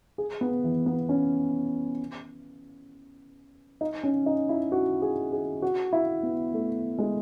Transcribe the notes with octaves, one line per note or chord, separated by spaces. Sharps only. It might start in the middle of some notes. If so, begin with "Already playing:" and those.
G#4
B3
E3
B3
C#4
D#4
C#4
D#4
E4
F#4
G#4
G#4
F#4
E4
B3
A3
G#3